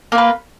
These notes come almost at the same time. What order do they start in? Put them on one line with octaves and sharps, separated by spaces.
A#3 F4 B4